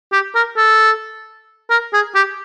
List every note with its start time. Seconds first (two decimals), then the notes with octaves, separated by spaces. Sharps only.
0.12 G4
0.35 A#4
0.57 A4
1.70 A#4
1.93 G#4
2.15 G4